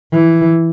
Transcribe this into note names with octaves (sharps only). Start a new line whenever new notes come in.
E3